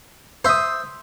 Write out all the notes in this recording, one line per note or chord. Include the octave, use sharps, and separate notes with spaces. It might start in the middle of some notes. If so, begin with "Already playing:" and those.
C5 E5 C6 D#6